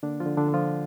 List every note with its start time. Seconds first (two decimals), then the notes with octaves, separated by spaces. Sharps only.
0.03 D3 A#3 D4
0.20 F3 F4
0.26 D3
0.37 D3 D4
0.48 D3
0.54 F3 F4